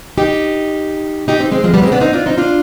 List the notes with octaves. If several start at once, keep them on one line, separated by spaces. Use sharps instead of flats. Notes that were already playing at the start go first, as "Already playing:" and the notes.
D#4 G4
D#4 G4
C4 D#4
G#3 C4
F3 G#3
G3 B3
G#3 C4
B3 D4
C4 D#4
D4 F4
C4 D#4
D4 F4